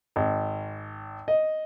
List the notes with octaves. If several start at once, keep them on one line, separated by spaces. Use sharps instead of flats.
G#1
D#5